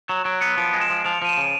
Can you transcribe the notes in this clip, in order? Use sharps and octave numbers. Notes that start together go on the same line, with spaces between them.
F#3 E7
F#3 D7
B3 C#7
F3 D7
G#3
E7
F3
F3 F7
F3 D#7
E7
C#3